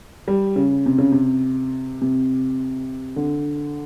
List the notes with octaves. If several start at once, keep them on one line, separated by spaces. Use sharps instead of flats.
G3
C#3
C3
C#3
C3
C3
D3